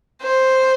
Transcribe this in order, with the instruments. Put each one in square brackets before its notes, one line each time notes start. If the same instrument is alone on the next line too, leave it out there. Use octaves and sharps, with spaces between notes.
[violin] C5